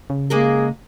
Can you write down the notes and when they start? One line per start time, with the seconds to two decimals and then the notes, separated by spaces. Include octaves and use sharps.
0.10 C#3
0.30 G#3 A#3 G#4 A#4